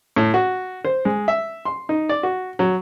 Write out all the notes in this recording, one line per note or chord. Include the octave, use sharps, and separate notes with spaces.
A2
F#4
C5
G#3
E5
C6
D#4
D5
F#4
F#3